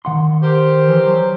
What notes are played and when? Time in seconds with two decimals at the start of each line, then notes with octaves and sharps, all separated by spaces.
0.05 D#3 F#5 C6
0.42 G4 A#4 C5
0.88 E3
1.01 F#3